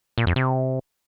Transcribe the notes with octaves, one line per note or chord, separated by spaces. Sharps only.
A#2
F2
C3